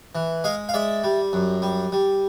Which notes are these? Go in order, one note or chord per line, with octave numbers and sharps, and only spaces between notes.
E3
G#3 D#5 F5
F5
G#3 D5 E5
G3
F#2
G3
G3